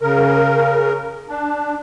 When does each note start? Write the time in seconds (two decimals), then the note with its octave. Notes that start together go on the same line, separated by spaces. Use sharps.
0.01 C#3 A#4
1.29 D4